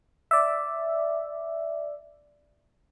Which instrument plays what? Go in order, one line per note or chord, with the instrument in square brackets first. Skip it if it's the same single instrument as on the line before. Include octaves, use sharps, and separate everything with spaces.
[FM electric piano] D5 E5